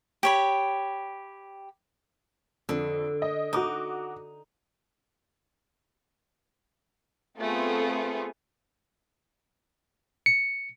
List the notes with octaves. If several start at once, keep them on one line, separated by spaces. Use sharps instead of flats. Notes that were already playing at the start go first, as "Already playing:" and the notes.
G4 C#5 B5
F2 D3
D#5
D#4 F#4 D6 D#6
A3 B3 C4 F4 G#4 A4
C#7